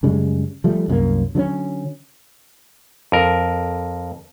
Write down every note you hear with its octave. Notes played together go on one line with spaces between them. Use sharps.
F#2 C#3 G3 G#3
F3 G3 A3
C2 F#2 G3 A#3
D3 F#3 A3 C#4
F2 A#4